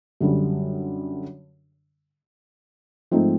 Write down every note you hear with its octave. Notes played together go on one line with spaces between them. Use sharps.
F#2 D3 G3
G#2 F3 A3 C4 D#4